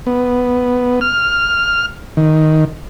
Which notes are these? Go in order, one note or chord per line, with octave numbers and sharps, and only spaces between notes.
B3
F6
D#3